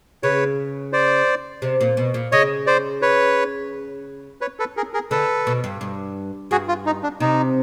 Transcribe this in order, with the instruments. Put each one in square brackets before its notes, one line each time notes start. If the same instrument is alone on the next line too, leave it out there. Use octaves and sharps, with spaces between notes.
[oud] C#3 [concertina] B4 C#5
[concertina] C5 D5
[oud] C3
A#2
B2
A#2
[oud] C#3 [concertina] C#5 D#5
[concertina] C5 D5
B4 C#5
B4 C#5
A4 B4
G#4 A#4
G#4 A#4
[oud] D3 [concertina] A4 B4
[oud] B2
G2
G2
[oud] G2 [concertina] F#4 G#4
[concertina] F4
D#4
D4
[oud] C3 [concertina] D#4